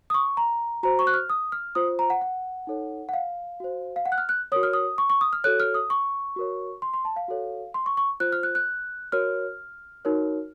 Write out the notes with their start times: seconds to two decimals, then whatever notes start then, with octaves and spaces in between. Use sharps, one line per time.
0.10 D#6
0.14 C#6
0.37 A#5
0.83 F#4 C5 A#5
0.99 C#6
1.07 F#6
1.14 F6
1.30 D#6
1.52 F6
1.75 F4 C5 D#6
1.99 A#5
2.10 F#5
2.21 F#5
2.67 D#4 A4 C#5
3.09 F#5
3.13 F5
3.60 F#4 C5
3.96 F5
4.06 F#5
4.12 F#6
4.18 F6
4.29 F#6
4.52 F#4 A#4 C#5 D#6
4.63 F6
4.73 D#6
4.98 C#6
5.10 C#6
5.21 D#6
5.33 F6
5.44 F#4 A4 C#5 F#6
5.60 F6
5.74 D#6
5.90 C#6
6.36 F#4 A#4 C#5
6.82 C6
6.94 C6
7.05 A5
7.16 F5
7.28 F#4 A4 C#5
7.74 C6
7.86 C#6
7.97 C#6
8.20 F4 C5 F#6
8.33 F6
8.43 F#6
8.55 F#6
9.12 F#4 A#4 C#5 F6
10.05 D#4 F#4 A#4 C#5